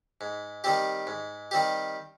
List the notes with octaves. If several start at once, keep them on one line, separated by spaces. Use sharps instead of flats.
G#2
D#3 G3 C4 G4
G#2
D#3 G3 C4 G4